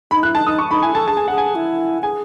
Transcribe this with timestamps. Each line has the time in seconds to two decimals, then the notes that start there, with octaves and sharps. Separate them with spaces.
0.11 D#4 B5
0.23 E4 F#6
0.35 D#4 A5
0.47 D#4 D#6
0.59 C#6
0.71 D#4 B5
0.82 E4 G#5
0.94 A4 A5
1.06 G#4 A5
1.17 G#5
1.28 G#4 F#5
1.38 G#5
1.55 E4
2.03 G#4 G#5